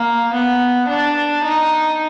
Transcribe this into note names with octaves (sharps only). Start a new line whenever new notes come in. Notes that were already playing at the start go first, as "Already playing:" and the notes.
Already playing: A#3
B3
D4
D#4